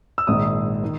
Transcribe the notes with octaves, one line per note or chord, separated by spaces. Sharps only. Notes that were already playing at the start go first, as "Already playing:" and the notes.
E6
A#1 G#2 D#3 D#6
D#3